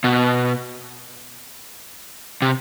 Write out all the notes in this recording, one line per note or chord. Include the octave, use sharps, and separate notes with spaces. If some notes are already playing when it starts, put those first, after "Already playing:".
B2
C3